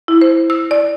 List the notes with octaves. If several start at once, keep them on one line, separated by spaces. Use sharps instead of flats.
E4
C5
E6
D5